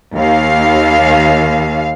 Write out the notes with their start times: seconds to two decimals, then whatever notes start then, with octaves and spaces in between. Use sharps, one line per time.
0.14 D#2 F5